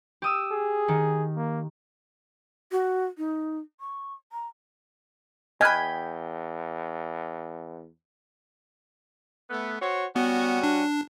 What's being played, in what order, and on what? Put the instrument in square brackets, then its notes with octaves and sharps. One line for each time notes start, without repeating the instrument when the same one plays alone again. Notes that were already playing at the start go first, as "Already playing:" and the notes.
[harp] G4 D#6 E6
[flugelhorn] G#4
[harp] D#3
[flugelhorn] A#3
[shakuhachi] F#4
D#4
C#6
A#5
[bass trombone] E2 [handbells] D#5 F6 F#6 [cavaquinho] G5 B5 [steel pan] G#5
[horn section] A3 B3
F#4 C5 C#5
[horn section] G3 C#4 F#4 [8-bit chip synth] B3
[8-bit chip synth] D4